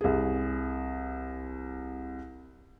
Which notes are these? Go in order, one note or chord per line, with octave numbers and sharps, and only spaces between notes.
C2 G#4